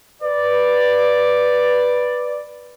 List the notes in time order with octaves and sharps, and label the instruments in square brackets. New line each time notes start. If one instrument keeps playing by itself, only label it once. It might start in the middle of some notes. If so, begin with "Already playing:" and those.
[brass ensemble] B4 D5